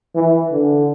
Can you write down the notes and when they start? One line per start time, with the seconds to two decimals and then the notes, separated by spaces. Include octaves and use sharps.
0.15 E3
0.51 D3